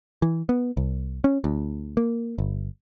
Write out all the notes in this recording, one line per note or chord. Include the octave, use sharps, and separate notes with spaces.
E3
B3
C2
C#4
D2
A#3
G1